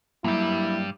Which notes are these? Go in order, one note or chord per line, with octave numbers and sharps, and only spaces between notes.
G2 F#3 G3 A#3 E4